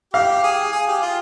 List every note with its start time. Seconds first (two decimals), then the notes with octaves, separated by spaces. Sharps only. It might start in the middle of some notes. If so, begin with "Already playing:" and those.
0.13 G4 F5
0.43 G#4
0.72 G#4
0.87 G4
1.02 F4